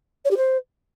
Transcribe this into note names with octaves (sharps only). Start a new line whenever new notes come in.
C#5
G4
C5